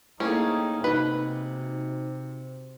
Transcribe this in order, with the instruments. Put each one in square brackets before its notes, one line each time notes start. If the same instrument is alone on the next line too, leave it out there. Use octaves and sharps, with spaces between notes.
[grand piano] A3 A#3 G#4 [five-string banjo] C#4 [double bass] D#4 [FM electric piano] E4 C5 G5
[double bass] C3 [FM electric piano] D#4 F#4 [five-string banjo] B4